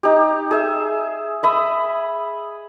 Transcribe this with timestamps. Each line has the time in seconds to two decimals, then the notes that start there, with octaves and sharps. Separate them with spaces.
0.03 D#4 G4
0.51 G#4 E5
1.43 E5 B5 D#6